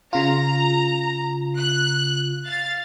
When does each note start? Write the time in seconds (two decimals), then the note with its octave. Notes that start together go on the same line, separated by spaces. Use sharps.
0.13 C#3 F4 A#5
1.57 F#6
2.45 F5 A6